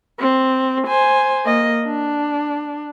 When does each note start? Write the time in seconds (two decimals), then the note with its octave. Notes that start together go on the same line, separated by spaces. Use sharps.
0.20 C4
0.88 C5 G#5
1.46 A#3 D#5
1.85 D4